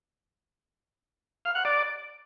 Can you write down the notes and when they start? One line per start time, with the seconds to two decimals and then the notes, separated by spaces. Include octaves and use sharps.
1.45 F5
1.55 F#5
1.65 D5